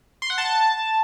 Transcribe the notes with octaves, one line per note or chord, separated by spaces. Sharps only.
C6
F#5
A5